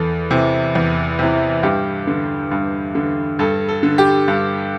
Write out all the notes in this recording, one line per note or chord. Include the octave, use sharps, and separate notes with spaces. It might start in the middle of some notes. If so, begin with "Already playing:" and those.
Already playing: E2 A4
C3 E3
E2
C3 E3
G2 G4
D3
G2
D3
G2 A4
A4
D3
G4
G2